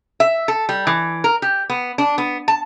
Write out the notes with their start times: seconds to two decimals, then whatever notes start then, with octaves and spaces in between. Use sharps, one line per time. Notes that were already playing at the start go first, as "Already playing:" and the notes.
0.20 E5
0.48 A4
0.69 G3
0.87 E3
1.24 A#4
1.42 G4
1.70 B3
1.98 D4
2.18 B3
2.48 A5